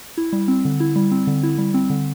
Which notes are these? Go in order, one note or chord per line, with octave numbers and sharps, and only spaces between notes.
E4
G3
C4
D3
E4
G3
C4
D3
E4
G3
C4
D3